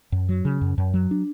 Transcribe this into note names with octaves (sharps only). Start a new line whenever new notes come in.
F#2
F#3
C#3
F#2
F#2
F#3
D4